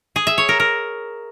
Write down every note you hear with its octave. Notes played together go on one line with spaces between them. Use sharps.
G#4
E5
C#5
A#4
A#4